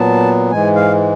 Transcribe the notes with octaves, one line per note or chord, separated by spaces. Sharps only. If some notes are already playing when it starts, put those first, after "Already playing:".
Already playing: A#2 F#3 B3 A5
G#2 E3 G#3 G#5
F5